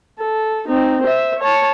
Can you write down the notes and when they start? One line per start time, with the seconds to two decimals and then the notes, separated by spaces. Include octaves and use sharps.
0.19 A4
0.68 C4 D#4
1.04 C5 E5
1.40 C#5 A5